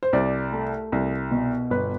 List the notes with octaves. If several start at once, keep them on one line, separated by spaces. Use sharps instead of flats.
C5
C2 D5
A3
C2
B2
G1 B4